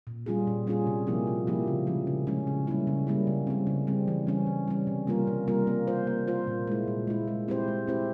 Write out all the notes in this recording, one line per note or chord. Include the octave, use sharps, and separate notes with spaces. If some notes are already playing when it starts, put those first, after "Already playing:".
A#2
G3 C#4 F4 G#4
A#2
G3 C#4 F4 G#4
C3
F3 A#3 E4 G4
C3
F3 A#3 E4 G4
C#3
F3 G#3 C#4
C#3
F3 G#3 C#4
C#3
G3 A#3 C#4 E4
C#3
G3 A#3 C#4 E4
C#3
G3 C4
C#3
G3 C4
E3
G3 C#4
E3
G3 C#4
C3
G3 A#3 F4 A#4
C3
G3 A#3 F4 A#4
A#3
F4 C5
A#3
F4 C5
A#2
G#3 E4
A#2
G#3 E4
G#3
C4 E4 G4 C5
G#3
C4 E4 G4 C5